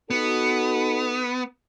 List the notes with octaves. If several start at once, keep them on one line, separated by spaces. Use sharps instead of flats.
B3 D#4 F#4 A4